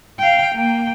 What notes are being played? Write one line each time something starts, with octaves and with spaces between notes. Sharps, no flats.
F5 G5
A#3 G5